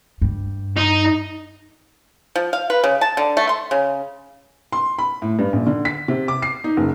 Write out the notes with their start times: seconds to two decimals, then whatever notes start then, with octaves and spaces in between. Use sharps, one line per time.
0.22 G2
0.77 D#4
2.35 F3
2.53 F5
2.70 B4
2.84 C#3
3.01 A5
3.17 D3
3.37 A3
3.49 C6
3.71 C#3
4.72 C6
4.98 B5
5.22 A2
5.39 G2
5.53 A#1
5.67 D3
5.85 B6
6.08 C3
6.28 D6
6.42 C7
6.64 D#4
6.77 F#1